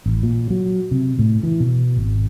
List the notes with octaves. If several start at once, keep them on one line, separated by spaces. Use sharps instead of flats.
A1
A#2
F#3
C3
A2
E3
B2
G#1